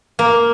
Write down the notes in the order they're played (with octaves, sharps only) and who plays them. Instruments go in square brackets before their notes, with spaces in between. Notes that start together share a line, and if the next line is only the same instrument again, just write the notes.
[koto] A#3